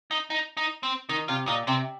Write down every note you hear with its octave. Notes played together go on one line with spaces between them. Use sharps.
D#4
D#4
D#4
C4
D#3 D#4
C3 F4
A#2 D#4
C3 C4